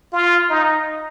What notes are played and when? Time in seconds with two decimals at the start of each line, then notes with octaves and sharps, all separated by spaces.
0.13 F4
0.50 D#4